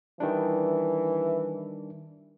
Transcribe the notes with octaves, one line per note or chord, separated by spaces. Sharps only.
D#3 E3 G3 D4